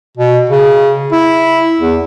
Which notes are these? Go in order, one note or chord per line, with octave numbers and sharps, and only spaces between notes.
B2
C#3
E4
E2